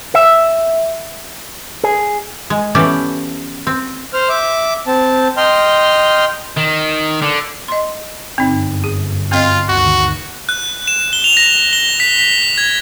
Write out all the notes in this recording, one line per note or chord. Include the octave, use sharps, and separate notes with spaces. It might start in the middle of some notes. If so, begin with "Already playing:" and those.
E5
G#4
G#3
E3 B3 C#4 G4 A4 D5
C4
C5 F6
E5 D6
C4 A5
D#5 G5 C6 F6
D#3
D3
D#5 C6
G1 F#2 C4 D#4
G#4
C4 F4 D#5
G1 D2 D#3 F#4
F#6
E7
G7
F7
A#6
G7
B6
B6
G#6